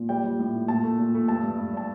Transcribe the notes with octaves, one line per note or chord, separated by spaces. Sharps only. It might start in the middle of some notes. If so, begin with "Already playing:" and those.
Already playing: A#2
G3 G5
G3
A2
A2
A#2 A5
A3
A#2
A3
G2 A5
G2
G2
G3 A5